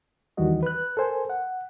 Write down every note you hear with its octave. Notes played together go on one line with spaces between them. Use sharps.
D#2 D#3 E3 G3 F#4 D#5
B4 F#6
A4 A#4 C5 G#5
F#5